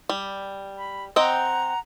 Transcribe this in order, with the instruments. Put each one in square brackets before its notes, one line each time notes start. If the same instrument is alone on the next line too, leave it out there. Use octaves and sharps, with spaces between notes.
[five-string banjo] G3
[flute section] B5
[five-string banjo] C4 D#5 G5 [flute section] F#5 A#5